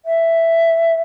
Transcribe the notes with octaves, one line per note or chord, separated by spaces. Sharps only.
E5